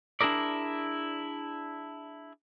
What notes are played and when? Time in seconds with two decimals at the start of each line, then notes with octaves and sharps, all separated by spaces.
0.21 D4 E4 G#4 A#4 D5